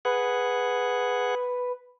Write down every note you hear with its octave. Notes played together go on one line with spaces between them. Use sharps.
G#4 B4 F#5